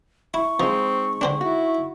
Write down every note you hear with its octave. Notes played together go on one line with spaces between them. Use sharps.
E4 C#6
F3 G#3 C4 D#4
D3 C4 D4
E4 F#4